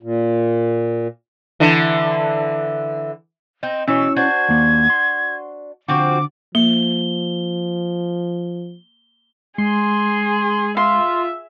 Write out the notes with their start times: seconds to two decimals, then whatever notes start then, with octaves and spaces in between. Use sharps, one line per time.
0.03 A#2
1.60 D3 E3
3.63 C4 D#4 D#5
3.88 B2 E3 C#4 E4 C#5 E6
4.16 D4 F#4 C5 G#6
4.49 D#2 A#3
4.90 C6
5.88 D3 F3 C4 F#4 F#5 D6
6.55 F3 A#3 G7
9.58 G#3 G#4 C6
10.77 F4 E5 C6